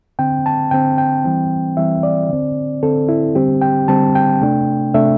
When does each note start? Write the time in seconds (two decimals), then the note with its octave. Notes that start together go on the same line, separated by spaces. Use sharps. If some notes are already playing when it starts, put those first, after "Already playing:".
0.19 D3 C4 G5
0.46 A5
0.71 D3 C4 G5
0.98 G5
1.24 E3 G3 C4
1.77 E3 G3 C4 E5
2.03 D5
2.29 D3 C4
2.83 D3 C4 A4
3.09 E4
3.35 D3 G3 C4 G4
3.62 G5
3.88 D3 G3 C4 A5
4.15 G5
4.41 C3 A3 D4
4.94 C3 A3 D4 E5